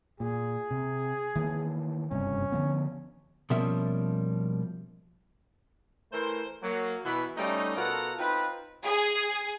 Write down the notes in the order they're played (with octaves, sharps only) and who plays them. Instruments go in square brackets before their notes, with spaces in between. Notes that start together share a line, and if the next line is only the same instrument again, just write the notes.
[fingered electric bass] A#2 [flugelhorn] G#4
[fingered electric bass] C3
D#3 E3 A#3
[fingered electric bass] F#1 G2 C3 [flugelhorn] C#4
[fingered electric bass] D3 F3 B3
[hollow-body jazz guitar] B2 F3 G3 A#3 C#4 E5
[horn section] E3 A3 A#4 C5
F#3 A#3
B2 E3 B5
G3 A3 C#4 D#4
B2 F4 A4 A#4 F#5 A#5
C4 D#4 F4 B4
[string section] G#4